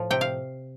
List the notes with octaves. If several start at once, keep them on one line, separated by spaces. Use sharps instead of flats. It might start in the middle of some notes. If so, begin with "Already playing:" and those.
Already playing: A2 F3
C3 G5
F5